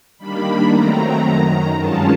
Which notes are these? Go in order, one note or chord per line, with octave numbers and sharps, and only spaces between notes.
D#3 G3 A#3 D4 B5
D#3 F#3 A3 C4 A#5
F#2 D#3 F#3
G2 D#3 G#3 C#4 F4 A5